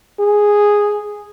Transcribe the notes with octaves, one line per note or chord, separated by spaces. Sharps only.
G#4